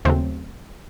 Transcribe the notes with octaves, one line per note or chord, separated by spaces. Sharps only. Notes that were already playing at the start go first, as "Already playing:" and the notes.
D#2 C#3 F#3 A3 C4